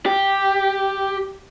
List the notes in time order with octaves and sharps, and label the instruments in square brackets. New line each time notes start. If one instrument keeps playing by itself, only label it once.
[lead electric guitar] G4